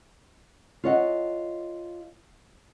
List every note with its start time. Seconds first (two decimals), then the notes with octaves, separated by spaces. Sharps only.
0.84 F4 A4 C#5 D#5 F#5